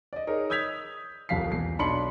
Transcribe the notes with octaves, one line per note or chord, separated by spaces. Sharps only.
D5 D#5
D#4 G#4 A#4 C#5 D#5
D#6 E6 G6 G#6 B6 F7
D#1 C2 F2 F5 B6 C7
E2 C7
B1 D4 B5 C6 C#7 F#7